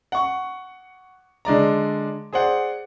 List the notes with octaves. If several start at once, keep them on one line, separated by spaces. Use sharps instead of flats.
F#5 C#6
D3 G#3 D5 A#5
G#4 C5 D5 F#5